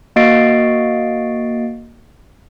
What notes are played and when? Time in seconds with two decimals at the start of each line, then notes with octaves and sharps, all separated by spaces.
0.16 A#3 F#4 D#5 A6 C7 D7